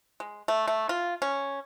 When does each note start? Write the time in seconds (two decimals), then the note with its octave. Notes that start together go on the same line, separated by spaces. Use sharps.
0.20 G#3
0.48 A3
0.68 A3
0.89 F4
1.22 C#4